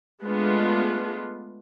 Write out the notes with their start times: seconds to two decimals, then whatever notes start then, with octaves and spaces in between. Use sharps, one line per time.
0.23 G#3 A3 B3 D4 F4